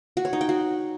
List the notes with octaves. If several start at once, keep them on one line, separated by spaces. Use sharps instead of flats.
F#4
C#5
D#4
G5
F#4